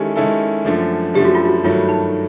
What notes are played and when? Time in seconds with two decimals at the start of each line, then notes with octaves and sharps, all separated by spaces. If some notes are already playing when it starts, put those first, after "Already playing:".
Already playing: D#3 G#3 C#4 E4 G4 A4
0.16 D#3 G#3 C#4 E4 A4
0.65 F#2 D3 F3 A3
1.14 F#2 D3 F3 A3 G4
1.25 F#4
1.35 F4
1.45 F#4
1.64 G2 D#3 F#3 A3 F4
1.89 D#4